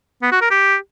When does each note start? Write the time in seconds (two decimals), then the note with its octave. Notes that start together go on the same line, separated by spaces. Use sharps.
0.22 B3
0.32 F#4
0.41 A#4
0.51 G4